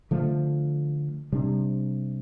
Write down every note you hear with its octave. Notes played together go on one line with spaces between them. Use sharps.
D3 F3 A3
C3 G3 D4